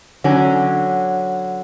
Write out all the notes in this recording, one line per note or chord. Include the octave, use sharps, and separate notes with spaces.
D3 F#3 C#4